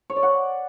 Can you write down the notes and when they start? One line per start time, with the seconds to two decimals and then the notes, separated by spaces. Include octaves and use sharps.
0.10 C#5
0.16 D5
0.23 F#5